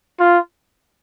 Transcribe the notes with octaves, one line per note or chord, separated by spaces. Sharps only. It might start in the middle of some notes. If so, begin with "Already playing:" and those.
F4